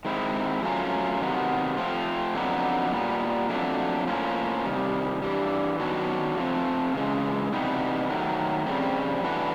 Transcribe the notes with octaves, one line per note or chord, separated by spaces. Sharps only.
D#3 G#3 C4 E4
F#3 A3 C#4 F4 A#4
C3 D#3 F#3 B3
F3 A3 C4 F4
F2 D3 F#3 B3 D#4
A#2 G3 B3
F2 D3 F#3 A3 D4
A2 F3 A#3 C#4 F4
C3 D#3 G3
G2 E3 G3
D#3 F#3 B3 D4 F#4
F3 A3 C4
C#3 E3 G#3
C3 E3 G3 B3 D#4
D#3 F#3 A3
F2 C#3 E3 G3 C4
E3 A3 D4 F#4 B4